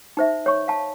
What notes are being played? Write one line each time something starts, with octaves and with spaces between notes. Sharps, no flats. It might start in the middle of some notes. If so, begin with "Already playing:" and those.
D#4 C5 E5
C#5 C#6
F5 A5